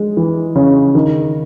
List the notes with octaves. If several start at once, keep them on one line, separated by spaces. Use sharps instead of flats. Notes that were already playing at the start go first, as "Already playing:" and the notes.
Already playing: G#3
E3
C#3
D#3